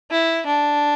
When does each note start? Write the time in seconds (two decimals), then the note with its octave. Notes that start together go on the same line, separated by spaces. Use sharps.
0.11 E4
0.46 D4